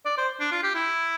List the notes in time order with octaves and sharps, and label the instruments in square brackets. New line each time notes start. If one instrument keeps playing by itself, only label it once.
[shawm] D5
C5
D4
F4
G4
E4